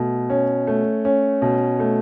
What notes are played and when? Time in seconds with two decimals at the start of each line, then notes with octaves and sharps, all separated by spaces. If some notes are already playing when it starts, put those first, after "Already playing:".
Already playing: B2 A3
0.30 C#4
0.67 A3
1.05 C#4
1.42 B2
1.80 A3